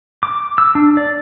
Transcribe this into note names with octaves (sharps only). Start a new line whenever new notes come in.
D6
E6
D4
D5